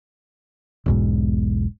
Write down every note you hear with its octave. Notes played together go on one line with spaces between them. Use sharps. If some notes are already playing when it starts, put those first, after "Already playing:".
E1 B1 G#2